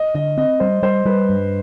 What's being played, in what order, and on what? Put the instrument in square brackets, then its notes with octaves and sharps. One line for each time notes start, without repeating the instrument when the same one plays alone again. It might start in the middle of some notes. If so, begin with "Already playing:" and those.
Already playing: [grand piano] D#5
[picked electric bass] D3 [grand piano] D#5
[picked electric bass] C4 [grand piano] D#5
[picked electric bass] G3 [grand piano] C5
[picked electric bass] G3 [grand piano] C5
[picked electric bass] G3 [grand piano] B4
[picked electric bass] G2